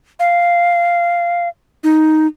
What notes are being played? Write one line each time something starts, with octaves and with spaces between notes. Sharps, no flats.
F5
D#4